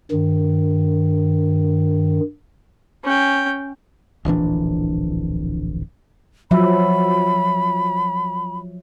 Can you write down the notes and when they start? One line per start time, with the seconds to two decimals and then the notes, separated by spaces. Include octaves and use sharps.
0.12 G2 D#3
3.04 C#4 G5
4.25 D1 A#1 E3 D4
6.51 F3 F#3 E5 B5